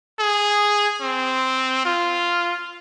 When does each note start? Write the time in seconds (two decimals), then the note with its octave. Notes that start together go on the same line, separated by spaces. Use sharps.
0.19 G#4
1.01 C4
1.85 F4